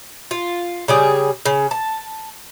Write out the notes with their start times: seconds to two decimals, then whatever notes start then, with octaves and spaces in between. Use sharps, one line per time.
0.31 F4
0.88 C#3 G3 G#4
1.46 C#3
1.71 A5